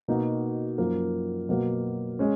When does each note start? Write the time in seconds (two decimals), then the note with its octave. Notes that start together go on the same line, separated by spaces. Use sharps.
0.08 B2 A#3 D#4 F#4
0.78 F#2 F3 A#3 F4 A#4
1.49 B2 F#3 A#3
2.19 G#3 C#4